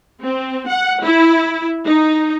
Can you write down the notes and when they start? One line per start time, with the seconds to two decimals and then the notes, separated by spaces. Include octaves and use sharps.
0.24 C4
0.69 F#5
1.04 E4
1.85 D#4